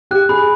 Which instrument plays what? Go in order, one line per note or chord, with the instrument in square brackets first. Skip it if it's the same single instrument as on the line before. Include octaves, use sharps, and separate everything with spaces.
[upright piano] G4 [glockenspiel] F#6
[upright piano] G#4 [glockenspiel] B5